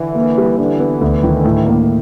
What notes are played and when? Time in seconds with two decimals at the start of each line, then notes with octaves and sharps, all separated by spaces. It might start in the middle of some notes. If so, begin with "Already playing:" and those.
Already playing: D3 E3
0.15 A#3
0.38 G3
0.58 D3 E3 D4
0.80 B3
1.01 D2
1.23 D#3
1.44 A2
1.66 A#3